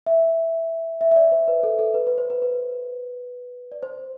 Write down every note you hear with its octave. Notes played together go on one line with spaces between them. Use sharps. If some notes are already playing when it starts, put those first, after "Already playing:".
E5
E5
E5
D5
C5
B4
A4
A4
B4
B4
C5
B4
B4
D5
C5